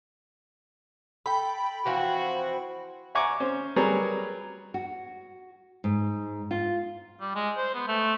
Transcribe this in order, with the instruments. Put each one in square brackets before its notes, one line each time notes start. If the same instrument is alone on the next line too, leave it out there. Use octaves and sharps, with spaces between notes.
[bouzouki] A4 [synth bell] G5 B5
[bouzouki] E3 F3 C4 [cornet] F#4
[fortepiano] E5 F#5 G#5 A#5 C#6 D6
C#4 C5
F#3 G3 G#4 A#4 B4 C#5
[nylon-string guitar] F#4
G#2
F4
[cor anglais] G3
G#3
C5
B3
A3